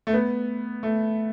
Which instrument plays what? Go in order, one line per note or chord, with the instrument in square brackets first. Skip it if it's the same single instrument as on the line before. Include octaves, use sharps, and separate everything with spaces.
[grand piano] A3
B3
A3